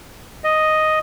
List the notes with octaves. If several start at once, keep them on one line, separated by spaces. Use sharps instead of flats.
D#5